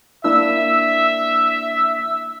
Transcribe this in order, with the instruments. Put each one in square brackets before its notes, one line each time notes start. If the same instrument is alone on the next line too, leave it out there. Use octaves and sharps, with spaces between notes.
[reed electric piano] A#3 D4 E4 [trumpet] E5 [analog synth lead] E6